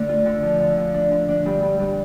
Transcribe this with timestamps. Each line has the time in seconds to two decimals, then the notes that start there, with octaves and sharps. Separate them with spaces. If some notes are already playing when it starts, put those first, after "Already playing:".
Already playing: D3 A3
0.09 F4
0.25 D3
0.43 F3
0.60 D3
0.77 D3
0.94 D4
1.11 D3
1.28 D4
1.46 G2
1.62 G2
1.79 G2